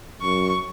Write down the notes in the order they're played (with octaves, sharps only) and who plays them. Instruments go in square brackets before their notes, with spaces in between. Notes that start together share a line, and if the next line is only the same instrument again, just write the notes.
[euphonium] F#2 [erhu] C#6